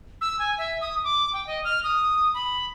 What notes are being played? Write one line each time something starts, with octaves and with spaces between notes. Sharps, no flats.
E6
G#5
E5
D#6
D6
G5
D#5
F6
D#6
B5